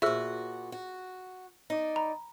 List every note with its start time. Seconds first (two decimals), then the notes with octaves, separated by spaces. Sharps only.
0.02 A#2 F4 F#4 G#4 C5 E5 E6
0.72 F#4
1.70 D#4 D5
1.96 A#5 B5